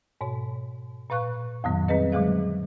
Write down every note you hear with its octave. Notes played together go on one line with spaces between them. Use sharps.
G#2 B2 C#5
A#2 B4 F5 C#6 F#6
F2 A2 D#3 F#3 B3
G3 C4 G#4 B4 D#5
D3 F#3 G#3 G#4 F5